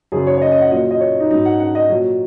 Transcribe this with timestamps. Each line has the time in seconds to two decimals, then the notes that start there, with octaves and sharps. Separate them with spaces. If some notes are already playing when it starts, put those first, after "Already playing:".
0.12 F#2 C#3 F#3 G#4
0.27 C#5
0.37 C#5
0.42 D#5
0.52 D#5
0.61 F#5
0.71 A#2 F#3 D#5
0.91 D#5
1.01 C#5
1.20 D#4
1.30 G#2 F#3 D#4
1.45 F#5
1.60 F#5
1.75 D#5
1.90 A#2 F#3